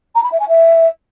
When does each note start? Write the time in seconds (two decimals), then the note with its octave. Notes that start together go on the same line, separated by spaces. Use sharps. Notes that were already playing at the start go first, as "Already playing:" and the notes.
0.15 A#5
0.23 B5
0.32 E5
0.40 G#5
0.48 E5